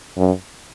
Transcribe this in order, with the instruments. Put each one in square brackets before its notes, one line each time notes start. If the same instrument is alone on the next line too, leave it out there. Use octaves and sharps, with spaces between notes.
[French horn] F#2